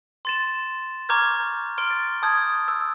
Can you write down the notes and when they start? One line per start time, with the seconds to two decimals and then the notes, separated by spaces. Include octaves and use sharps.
0.25 C6 A6 E7
1.09 A#5 C#6 D6 F6 G6 G#6
1.78 C6 F6 D7 G7
1.91 A6
2.23 A5 D#6 G6 G#6
2.68 E6